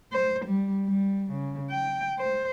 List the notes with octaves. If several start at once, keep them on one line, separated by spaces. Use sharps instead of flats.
C5
G3
G3
C#3
G5
C5